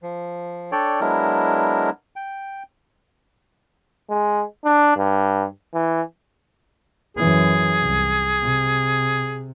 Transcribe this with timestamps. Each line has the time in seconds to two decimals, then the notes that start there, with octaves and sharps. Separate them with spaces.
0.03 F3
0.72 D4 A4 C#5 D5 G5
1.01 F#3 G#3 B3 D4 E4 A#4
2.16 G5
4.09 G#3
4.64 D4
4.96 G2
5.74 E3
7.17 F#2 E3 G#4
7.82 C2
8.42 C3